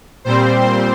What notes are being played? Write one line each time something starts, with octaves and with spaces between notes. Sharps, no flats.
A#2 G3 C4 C5
C5